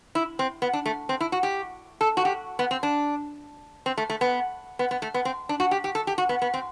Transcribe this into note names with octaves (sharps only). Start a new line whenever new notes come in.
E4
C4
B3
D4
A3
C4
E4
F#4
G4
A4
F#4
G4
B3
C4
D4
C4
A3
A3
B3
B3
B3
A3
B3
C4
D4
F#4
G4
G4
A4
G4
F#4
B3
B3
C4